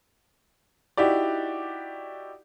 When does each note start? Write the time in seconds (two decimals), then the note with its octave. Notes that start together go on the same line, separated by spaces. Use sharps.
0.97 D#4 E4 F#4 G4 D5